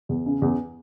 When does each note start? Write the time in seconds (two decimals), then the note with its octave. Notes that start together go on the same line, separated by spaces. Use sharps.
0.09 E2
0.26 C#3
0.42 E2